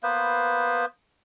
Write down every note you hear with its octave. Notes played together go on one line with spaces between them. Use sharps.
A#3 B3 B4 C5